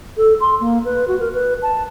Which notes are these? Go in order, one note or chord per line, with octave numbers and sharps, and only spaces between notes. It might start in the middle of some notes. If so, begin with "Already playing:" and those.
A4
C6
A#3
B4
F#4
A#4
B4
A5